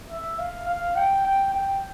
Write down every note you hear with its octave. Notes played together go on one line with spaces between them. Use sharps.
E5
F5
F5
G5
G5
G5